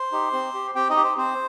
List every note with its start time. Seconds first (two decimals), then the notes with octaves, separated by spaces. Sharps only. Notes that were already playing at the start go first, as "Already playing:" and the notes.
Already playing: C5 C6
0.12 D#4 G4
0.33 C4
0.54 G4
0.75 C4 G4 G5
0.90 D#4 D#5
0.97 G4
1.04 C5
1.17 C4 C5